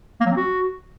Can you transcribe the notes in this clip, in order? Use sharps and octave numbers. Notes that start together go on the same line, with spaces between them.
A#3
F#3
C4
F#4